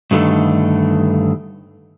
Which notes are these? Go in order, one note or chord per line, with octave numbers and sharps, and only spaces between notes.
G2 D3 D#3 A3